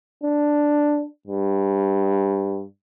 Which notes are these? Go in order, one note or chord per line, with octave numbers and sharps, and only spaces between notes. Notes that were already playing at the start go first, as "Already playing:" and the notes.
D4
G2